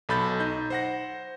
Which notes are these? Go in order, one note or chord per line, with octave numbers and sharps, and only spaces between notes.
B1 A4 B5 G6 A6
D#4 G6
C5 F#5 A#6